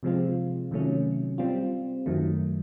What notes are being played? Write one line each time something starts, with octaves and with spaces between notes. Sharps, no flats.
C3 F3 G#3 C4 F4
C3 D#3 F#3 A3 C#4
G3 C4 F4
F#2 D#3 F#3 A3